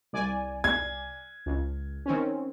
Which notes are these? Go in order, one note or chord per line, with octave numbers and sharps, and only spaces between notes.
C2 D5 G#5
G#6
C#2
D#3 C4 C#4